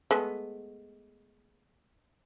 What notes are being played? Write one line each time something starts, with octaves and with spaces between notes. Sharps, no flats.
G#3 A3 B3